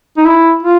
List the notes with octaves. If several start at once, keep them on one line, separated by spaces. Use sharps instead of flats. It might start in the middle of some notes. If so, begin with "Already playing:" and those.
D#4
E4
F4